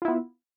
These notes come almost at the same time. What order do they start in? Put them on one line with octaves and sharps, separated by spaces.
F4 E4 B3